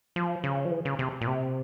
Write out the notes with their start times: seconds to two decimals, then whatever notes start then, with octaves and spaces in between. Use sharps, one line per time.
0.16 F3
0.44 C#3
0.65 F3
0.71 E3
0.85 C#3
0.99 C3
1.21 A#2
1.27 C3